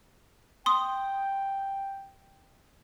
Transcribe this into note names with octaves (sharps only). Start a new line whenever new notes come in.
G5 C6 D#6